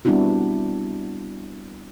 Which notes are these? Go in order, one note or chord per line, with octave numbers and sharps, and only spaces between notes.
G3 B3 C4 D4 E4 F#4